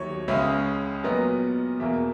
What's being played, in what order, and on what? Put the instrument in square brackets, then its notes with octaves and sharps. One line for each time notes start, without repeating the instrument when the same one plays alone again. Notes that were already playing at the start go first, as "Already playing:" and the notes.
Already playing: [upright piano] D#2 D#3 F#3 C#5
C#2 C#3 G#3 C#4 E5
A#2 F#3 B3 D#5
E2 B2 A#3 E5